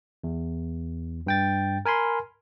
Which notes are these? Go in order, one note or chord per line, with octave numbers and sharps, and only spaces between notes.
E2
G2 G5 A6
A#4 G#5 B5 C6